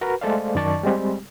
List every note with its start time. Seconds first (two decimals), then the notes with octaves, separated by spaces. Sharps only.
0.01 F#4 A#4 B4
0.21 G#3 A3 A4 C5 D5 F5
0.55 F#2 D#3 D5 A5 C#6
0.83 G3 G#3 C4 G4